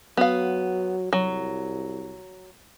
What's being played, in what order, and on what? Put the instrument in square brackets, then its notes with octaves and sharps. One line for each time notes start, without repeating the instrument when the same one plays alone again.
[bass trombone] F#3 [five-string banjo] B3 F5
[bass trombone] C2 [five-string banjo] F#3